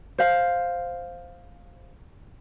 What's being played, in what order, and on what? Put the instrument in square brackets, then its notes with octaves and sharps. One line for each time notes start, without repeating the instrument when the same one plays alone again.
[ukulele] C5 F5